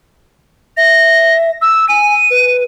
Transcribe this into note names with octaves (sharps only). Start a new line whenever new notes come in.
E5 A#6
E6
G#5 D#7
B4